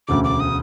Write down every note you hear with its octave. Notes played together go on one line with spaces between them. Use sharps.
E1 D2 C#3 D6
D6
D#6